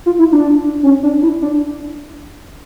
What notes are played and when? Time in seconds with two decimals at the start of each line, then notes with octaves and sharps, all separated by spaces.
0.06 F4
0.19 E4
0.32 D4
0.83 C#4
1.03 D4
1.22 E4
1.42 D4